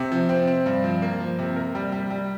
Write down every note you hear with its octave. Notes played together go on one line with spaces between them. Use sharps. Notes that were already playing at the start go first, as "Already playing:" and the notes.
Already playing: C3
F3
C4
C4
G2
F3
A#3
F3
C3
A#4
G3
G3
G3